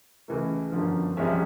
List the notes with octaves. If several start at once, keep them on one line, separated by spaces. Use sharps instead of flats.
C#2 C#3 E3 A3
G1 F#2 D3 F3
C2 C3 F3 G#3 C#4 E5